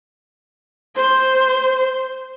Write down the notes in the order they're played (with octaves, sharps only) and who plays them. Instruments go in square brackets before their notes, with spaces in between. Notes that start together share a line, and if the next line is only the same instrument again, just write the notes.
[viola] C5